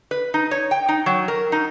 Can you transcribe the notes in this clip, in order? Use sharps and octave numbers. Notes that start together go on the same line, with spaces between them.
B4
D#4
C#5
G5
D#4
F#3
A#4
D#4